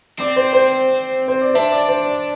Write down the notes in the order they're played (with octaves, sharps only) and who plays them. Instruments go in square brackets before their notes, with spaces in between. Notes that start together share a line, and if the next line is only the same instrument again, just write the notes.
[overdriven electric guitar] C4 [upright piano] D5
[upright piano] C5
C5
C5
D5
[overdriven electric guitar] D4 [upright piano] C5 E5
[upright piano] D5
C5
D5